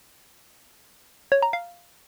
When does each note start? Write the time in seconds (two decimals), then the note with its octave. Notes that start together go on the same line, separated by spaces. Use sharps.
1.32 C#5
1.42 A#5
1.53 F5